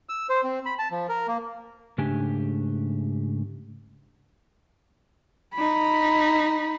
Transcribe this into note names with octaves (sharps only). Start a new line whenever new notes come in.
E6
C5
C4
B5
A5
F3
A#4
A#3
G#2 C#3 A3 D4 G4 G#5
D#4 B5